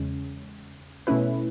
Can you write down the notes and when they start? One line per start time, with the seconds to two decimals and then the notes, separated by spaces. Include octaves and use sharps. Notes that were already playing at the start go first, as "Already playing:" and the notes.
Already playing: E2 C#3 G#3 C#4
1.07 B2 A3 C#4 E4 B4